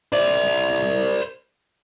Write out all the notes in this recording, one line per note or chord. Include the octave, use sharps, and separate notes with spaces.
C5 D5